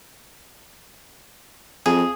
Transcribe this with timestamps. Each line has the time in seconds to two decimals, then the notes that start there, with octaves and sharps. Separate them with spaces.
1.86 F2 G#4